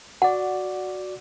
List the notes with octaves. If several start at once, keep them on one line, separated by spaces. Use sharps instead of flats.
F#4 D5 F#5